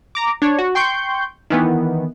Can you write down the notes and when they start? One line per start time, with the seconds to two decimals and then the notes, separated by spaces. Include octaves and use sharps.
0.15 A#5 D6
0.42 D4 C#5
0.59 F#4
0.75 G5 C6 C#6 G6
1.50 D#3 E3 B3